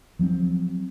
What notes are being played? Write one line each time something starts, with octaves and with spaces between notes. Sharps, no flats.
F3 F#3 A#3 C4